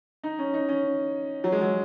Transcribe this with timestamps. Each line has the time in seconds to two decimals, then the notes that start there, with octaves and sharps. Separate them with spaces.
0.24 D#4
0.39 C#4
0.54 D#4
0.69 C#4
1.44 F#3
1.52 G#3
1.62 F#3